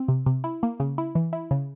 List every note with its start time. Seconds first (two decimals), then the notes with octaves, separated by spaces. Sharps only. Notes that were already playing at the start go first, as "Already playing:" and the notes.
Already playing: C4
0.08 C3
0.26 C3
0.44 E4
0.63 A#3
0.80 C#3
0.98 E4
1.15 E3
1.33 E4
1.51 C#3